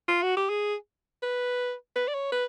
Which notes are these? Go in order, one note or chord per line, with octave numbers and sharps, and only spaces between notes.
F4
F#4
G4
G#4
B4
B4
D5
C#5
B4